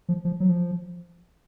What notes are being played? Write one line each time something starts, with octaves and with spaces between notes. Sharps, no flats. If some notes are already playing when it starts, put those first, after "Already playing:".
F3
F3
F#3
F3